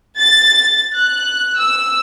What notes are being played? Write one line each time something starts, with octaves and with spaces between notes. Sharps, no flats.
A6
F#6
E6